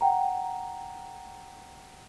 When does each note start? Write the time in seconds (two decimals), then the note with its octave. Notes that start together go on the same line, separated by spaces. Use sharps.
0.01 F#5 G5 A#5